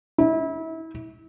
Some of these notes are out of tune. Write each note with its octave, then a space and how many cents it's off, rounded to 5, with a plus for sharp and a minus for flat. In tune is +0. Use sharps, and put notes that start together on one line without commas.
E4 -30